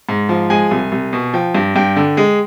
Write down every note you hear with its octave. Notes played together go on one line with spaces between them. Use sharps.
G#2
F3
G#3 G#5
C2
C2
B2
F3 G5
G2
G2 G5
D3
G#3